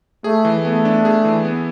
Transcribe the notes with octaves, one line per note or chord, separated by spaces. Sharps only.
A3 G#4
E3
A3 B3
D4
G#4
E3
B3